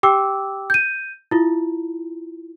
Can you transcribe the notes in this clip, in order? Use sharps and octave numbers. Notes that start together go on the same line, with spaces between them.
G4 G5 D6 E6
G6 D#7
E4 F4